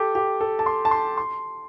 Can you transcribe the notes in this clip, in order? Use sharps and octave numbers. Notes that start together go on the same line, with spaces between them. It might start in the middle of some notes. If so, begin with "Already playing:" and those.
Already playing: G4 A4
G4
A4
A5
C6
A5
C6
C6